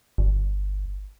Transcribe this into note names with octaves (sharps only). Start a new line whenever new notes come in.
G1